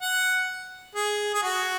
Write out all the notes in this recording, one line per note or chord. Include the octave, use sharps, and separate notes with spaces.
F#5
G#4
G#4
F#4